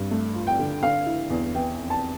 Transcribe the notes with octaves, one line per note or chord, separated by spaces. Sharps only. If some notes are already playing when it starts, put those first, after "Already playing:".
Already playing: G2
A3
F4
G5
D3
D3 F5
E4
E2
E3 G5
F2
A5